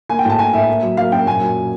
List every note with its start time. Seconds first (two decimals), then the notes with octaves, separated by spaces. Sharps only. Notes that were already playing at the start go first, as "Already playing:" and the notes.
0.10 A#3 G#5
0.19 G5
0.25 A2 A5
0.39 A2 G#5
0.53 A2 E5
0.69 A#3
0.83 F#3
0.97 A#3 F5
1.12 F#2 G5
1.27 A#2 G#5
1.41 F#3